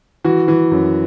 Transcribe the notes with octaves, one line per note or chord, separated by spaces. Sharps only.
E3 F#4
E3
F#2